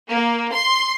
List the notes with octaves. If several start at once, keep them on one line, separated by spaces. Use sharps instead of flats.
A#3
C6